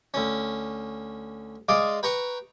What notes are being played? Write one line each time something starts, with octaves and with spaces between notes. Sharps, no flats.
D2 C#4
G#3 D5 F5 D6 D#6
B4 G5 A#5 C#6